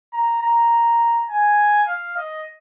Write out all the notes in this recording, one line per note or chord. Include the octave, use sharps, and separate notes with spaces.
A#5
A#5
G#5
F5
D#5